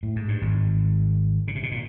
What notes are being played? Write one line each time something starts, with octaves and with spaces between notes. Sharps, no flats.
A2
G#2
G2
G#1 G#2
C#3
C3
B2
A#2